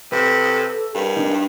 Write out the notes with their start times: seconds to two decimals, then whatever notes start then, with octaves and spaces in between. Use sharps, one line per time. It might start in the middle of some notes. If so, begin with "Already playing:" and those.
0.12 C3 A4 B4
0.95 G2 A#4
1.17 D4 D#4